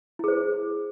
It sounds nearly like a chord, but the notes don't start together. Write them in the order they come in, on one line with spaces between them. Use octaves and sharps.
E4 G#4 C5